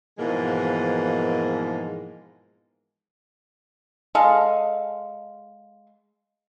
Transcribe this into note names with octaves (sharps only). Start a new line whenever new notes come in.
G#2 B2 E3 F3 G#3 A#3
G#3 A4 F5